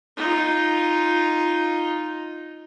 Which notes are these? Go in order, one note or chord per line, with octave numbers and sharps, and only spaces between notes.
D#4 F4